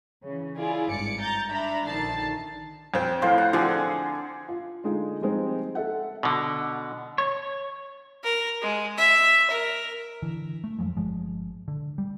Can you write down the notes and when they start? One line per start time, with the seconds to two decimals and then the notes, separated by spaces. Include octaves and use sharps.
0.25 C#3 E3
0.58 E4 F4 G#4 D5
0.90 G#1 G2 D5 D6 C#7
1.21 A#5 G6 A6
1.50 D4 E5 A#5 B5
1.86 A#1 D3 D#3 A5 A6 C7
2.94 F2 C4
3.22 A2 F3 C5
3.38 F#5
3.53 D3 F3 C4 G#4 F#5
4.48 F4
4.84 D3 G#3 D#4 F4
5.21 F3 G3 G#3 C4 D#4
5.75 A4 E5 F#5
6.23 B2 D3
7.18 C#5
8.23 A#4
8.62 G#3
8.98 E5
9.50 A#4
10.22 D3 E3
10.64 A3
10.79 F2 F3 F#3 G#3
10.96 G1 F3 G#3
11.68 D3
11.98 G3